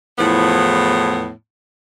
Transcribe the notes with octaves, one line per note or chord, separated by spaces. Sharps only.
E2 A2 F3 B3